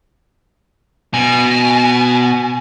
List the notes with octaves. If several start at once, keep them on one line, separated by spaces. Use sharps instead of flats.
B2 G#5